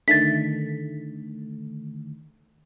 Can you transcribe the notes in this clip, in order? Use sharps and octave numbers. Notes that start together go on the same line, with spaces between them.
D3 D#3 A3 A6 B6